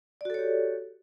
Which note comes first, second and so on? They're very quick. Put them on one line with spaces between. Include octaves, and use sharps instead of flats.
D5 F#4 A4 C#5 G4